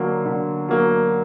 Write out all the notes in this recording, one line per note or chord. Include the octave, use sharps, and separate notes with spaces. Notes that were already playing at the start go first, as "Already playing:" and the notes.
Already playing: D3 F#3 A#3
D3
F#3 A#3